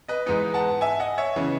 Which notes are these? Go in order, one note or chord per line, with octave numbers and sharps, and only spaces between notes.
B4 D#5
G#2 E3 G#3 B3 D#4 B4
F#5 A5
E5 G#5
D#5 F#5
C#5 E5
C#3 E3 B3